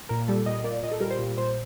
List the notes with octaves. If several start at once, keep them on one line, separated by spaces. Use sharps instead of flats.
A#2 A#4
G3 A4
A#2 D#5
A#3 D5
A#2 D#5
A4
G3 A#4
C5
A#2
A#2 C5